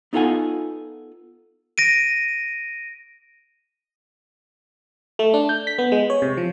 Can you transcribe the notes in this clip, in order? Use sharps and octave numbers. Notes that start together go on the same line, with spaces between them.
B3 D#4 F4 A4 F#5 G#5
A#6 D7 D#7
A3
D4
G6
B6
B3
G#3
C#5
C3
F3